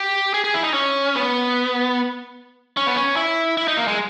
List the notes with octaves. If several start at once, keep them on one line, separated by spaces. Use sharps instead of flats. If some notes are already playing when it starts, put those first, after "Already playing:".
Already playing: G4
G#4
G#4
E4
D#4
C#4
B3
C#4
B3
C#4
E4
E4
D#4
A#3
G#3